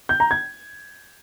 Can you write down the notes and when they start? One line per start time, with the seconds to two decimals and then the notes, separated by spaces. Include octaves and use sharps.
0.09 G6
0.20 A#5
0.31 G#6